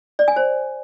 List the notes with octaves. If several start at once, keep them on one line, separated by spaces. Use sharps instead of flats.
D5
G#5
C5